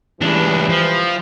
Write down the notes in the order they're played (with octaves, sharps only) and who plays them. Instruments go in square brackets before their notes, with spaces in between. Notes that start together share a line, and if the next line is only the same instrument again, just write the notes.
[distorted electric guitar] C#2 D4 [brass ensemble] E3 G3 B4
[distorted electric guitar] F3